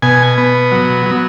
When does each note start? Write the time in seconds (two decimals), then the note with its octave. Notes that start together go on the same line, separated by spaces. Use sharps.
0.02 B2 G#5
0.38 B3
0.72 F#3
1.06 F#3